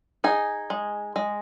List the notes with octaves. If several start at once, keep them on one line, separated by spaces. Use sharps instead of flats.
D#4 G#4
G#3
G#3